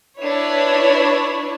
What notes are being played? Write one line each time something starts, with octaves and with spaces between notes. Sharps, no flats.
D4 E4 B4 C#5